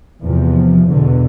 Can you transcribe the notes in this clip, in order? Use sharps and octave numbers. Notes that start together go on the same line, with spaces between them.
E2 C3 F3
E2 B2 D3